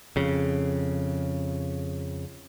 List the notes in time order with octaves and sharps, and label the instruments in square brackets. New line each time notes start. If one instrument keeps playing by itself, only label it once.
[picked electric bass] F2 C#3